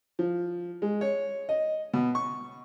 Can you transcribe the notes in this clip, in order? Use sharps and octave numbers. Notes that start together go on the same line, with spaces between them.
F3
G#3
C#5
D#5
B2
C#6